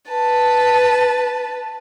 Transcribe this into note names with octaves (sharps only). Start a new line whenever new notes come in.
B4 A5